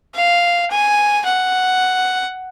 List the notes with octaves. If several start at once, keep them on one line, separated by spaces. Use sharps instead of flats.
F5
G#5
F#5